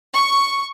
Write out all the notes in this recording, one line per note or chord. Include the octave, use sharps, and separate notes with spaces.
C#6